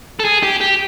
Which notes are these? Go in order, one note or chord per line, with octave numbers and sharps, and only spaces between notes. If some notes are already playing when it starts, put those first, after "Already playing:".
A4
G#4
G4
G4